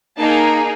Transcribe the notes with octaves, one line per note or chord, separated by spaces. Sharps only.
A#3 D#4 G#4 A5